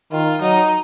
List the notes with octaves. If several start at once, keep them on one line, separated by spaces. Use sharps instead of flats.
D#3 F4
F#3 D#4